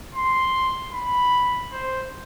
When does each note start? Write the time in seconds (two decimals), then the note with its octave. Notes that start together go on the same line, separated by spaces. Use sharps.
0.15 C6
0.93 B5
1.72 C5